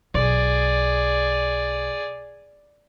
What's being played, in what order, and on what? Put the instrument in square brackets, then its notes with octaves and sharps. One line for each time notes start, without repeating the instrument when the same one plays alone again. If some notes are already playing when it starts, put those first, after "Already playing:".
[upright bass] B1 [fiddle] G#4 D5